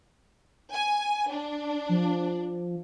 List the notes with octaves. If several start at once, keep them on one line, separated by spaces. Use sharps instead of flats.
G#5
D4
F3